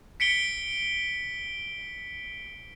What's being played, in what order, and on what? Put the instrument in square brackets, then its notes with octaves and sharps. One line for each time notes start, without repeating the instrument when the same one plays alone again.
[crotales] B6 C#7 D7 G7